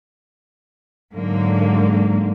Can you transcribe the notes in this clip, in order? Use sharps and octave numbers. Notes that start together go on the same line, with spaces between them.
G#2 D3 F#3 A#3